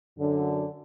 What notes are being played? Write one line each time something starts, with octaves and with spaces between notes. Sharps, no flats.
F#2 D3